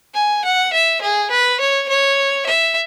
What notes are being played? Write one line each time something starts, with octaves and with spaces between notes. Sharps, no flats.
G#5
F#5
E5
G#4
B4
C#5
C#5
E5